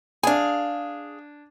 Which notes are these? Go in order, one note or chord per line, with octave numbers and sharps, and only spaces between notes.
D4 G#4 F5 G#5